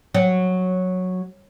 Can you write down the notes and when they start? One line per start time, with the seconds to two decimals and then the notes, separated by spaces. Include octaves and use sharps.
0.14 F#3